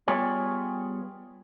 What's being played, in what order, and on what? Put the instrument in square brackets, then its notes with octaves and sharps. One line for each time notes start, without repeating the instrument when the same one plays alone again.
[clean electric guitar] G3 B3 F4 G#4 C#5